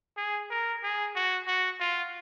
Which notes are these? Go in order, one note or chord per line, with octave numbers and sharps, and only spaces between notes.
G#4
A#4
G#4
F#4
F#4
F4